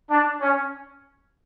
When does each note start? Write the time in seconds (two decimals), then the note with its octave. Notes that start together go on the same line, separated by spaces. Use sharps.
0.11 D4
0.41 C#4